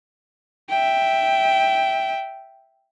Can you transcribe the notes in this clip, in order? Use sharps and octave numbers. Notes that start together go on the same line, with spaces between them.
E5 G5